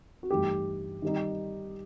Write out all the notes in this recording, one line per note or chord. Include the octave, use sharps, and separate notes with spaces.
F#4
G2 E3 A3 D#4 G4
D#3 G3 D#4